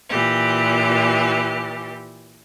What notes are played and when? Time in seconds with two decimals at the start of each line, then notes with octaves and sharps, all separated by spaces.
0.10 A#2 E3 G4